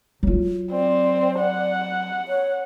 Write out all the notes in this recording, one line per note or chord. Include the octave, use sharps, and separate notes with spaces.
F#3 F4
C4 D5
F#5
C#5